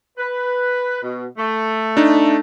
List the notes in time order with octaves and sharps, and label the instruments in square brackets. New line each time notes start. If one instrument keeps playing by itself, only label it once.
[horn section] B4
B2
A3
[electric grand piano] D4 D#4